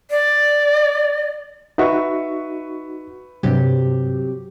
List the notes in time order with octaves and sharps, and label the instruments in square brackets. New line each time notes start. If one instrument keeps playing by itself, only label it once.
[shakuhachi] D5
[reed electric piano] D#4 F#4 [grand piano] B4 E5 C#6
[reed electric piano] G2 [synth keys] C3 F#3 G4